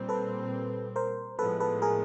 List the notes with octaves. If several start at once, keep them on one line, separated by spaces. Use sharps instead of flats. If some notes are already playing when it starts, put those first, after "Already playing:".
Already playing: A#2 G3 C4
A4 B4
A#4 C5
A2 F3 G#3 B3 A4 B4
A4 B4
G#4 A#4